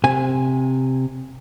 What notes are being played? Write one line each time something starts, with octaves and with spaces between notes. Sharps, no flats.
C3 G#5